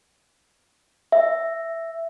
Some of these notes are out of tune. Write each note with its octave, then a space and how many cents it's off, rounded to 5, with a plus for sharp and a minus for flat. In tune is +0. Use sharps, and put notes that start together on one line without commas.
E5 +5